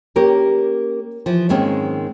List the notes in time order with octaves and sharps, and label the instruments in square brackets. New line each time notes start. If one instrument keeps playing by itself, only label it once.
[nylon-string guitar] A#3 C#4 G4 A#4
E3 F3
G#2 D#3 G#3 A#3 C4 C#4